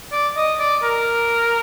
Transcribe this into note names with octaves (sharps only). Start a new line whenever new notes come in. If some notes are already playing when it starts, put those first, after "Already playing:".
D5
D#5
D5
A#4